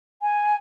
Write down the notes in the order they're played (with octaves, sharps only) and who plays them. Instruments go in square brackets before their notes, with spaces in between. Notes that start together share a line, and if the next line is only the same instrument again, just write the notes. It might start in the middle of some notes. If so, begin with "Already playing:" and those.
[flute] G#5